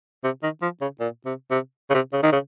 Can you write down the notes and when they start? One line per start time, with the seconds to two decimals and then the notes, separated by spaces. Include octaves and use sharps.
0.24 C3
0.43 D#3
0.62 F3
0.81 C#3
1.00 A#2
1.26 C3
1.51 C3
1.90 C#3
1.94 C3
2.13 C#3
2.23 D#3
2.32 C#3